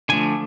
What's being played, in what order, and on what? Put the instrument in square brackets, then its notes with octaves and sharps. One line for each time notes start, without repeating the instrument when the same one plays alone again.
[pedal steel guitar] D3 F3 A3 D4 G#5